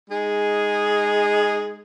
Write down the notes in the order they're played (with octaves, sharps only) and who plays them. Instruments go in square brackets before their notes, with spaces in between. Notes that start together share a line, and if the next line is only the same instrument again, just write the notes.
[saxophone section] G#3 D#4 G#4